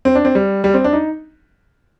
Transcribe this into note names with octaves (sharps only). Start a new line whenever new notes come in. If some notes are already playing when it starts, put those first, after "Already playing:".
C4
D4
C4
G3
G3
C4
D4
D#4